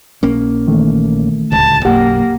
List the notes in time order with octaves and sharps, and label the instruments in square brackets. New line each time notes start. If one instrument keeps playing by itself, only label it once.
[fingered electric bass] A#1 A#3 C#4
[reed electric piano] D#3 E3 A3
[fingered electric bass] D1 C#2 [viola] A5
[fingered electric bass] B1 F#2 [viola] A#3 [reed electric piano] G4 F#5